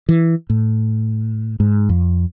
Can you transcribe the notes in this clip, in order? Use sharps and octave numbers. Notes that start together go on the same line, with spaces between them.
E3
A2
G#2
F2